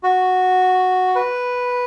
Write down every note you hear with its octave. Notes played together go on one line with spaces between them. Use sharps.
F#4
B4